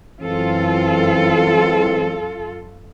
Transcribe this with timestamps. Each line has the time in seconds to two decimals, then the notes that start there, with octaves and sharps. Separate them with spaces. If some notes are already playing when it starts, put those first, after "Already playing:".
0.21 F#2 E3 G#3 C4 F4 A4